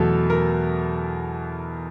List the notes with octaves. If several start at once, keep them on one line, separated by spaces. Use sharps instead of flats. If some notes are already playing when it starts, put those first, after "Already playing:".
Already playing: E2 B2 F#3 A3 A4
A#4